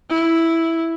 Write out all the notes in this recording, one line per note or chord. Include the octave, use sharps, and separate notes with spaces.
E4